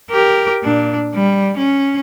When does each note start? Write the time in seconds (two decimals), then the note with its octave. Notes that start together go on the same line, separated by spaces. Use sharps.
0.10 G4 A#4
0.63 A#2 D4
1.15 G3
1.58 C#4